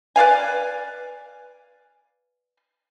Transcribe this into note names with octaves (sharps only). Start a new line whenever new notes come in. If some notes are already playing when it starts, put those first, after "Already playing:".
B4 D5 F5 G#5